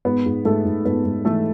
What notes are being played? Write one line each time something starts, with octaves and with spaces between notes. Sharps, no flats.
G#2 B3 B4
G#2
G#2 A3 A4
G#2
G#2 B3 B4
G#2
E3 A3 A4